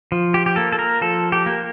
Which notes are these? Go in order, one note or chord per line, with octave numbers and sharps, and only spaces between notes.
F3
G4
G4
A#3 A4
A4
A#4
F3 A4
G4
A#3